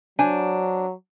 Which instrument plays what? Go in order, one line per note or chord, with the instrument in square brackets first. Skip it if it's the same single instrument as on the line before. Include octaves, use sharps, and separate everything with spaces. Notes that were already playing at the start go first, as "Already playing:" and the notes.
[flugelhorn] F#3 [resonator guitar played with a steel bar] D4 C5 G#5